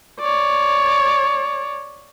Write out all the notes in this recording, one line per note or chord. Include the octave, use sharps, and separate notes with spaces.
C#5 D5